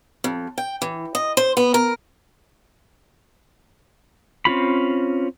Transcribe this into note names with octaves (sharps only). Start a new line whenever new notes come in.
F2
G5
E3
D#5
C5
B3
A#4
C4 C#4 F4 B5